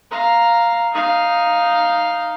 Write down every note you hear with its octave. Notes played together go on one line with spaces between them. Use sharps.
F5 A#5
D#4 F5